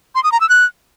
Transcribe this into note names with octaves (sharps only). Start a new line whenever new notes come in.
C6
D#6
A#5
E6
F#6